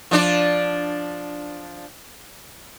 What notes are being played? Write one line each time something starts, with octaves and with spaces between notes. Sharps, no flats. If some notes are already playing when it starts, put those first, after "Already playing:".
F3 D4 D5